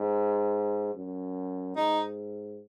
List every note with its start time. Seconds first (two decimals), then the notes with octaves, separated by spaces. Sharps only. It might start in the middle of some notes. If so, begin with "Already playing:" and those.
Already playing: G#2
0.95 F#2
1.76 G#2 D#4